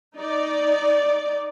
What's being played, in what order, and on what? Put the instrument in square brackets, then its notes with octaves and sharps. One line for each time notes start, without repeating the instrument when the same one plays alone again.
[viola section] D#4 D5